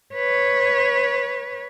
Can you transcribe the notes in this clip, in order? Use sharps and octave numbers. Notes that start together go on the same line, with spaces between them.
B4 C#5